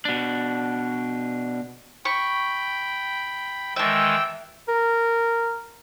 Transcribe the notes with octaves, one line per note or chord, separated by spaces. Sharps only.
B2 D4
G5 B5 C#6
D#3 E3 G#3 E5 G5 A5 E6
A#4